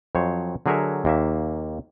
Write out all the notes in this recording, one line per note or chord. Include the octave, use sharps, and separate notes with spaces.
F2 F#3 C5 C#5
D3 F#3 G#4 A#4 C#5 E5
D#2 A#3 E5